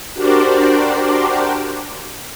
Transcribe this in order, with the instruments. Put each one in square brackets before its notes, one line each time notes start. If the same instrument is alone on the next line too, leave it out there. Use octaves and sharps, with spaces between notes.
[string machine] D4 F#4 G4 A#4 C5 D5